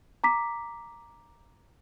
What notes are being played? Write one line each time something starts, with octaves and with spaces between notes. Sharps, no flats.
A#5 D6 B6